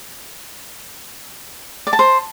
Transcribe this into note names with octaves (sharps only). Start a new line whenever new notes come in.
D5
A5
C5